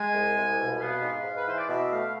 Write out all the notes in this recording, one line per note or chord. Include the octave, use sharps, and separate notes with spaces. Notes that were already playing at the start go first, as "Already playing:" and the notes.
Already playing: G#3 G#5
C2
C2
B2
B3 F5
G#2
G#2
B4
E3 C5
D5
B2 E5
A3 F5